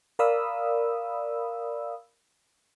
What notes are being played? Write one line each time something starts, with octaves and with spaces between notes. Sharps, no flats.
A#4 D5 F5 B5 D#6 E6